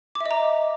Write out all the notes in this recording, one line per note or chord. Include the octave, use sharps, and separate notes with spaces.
D6
E5
D#5
A#5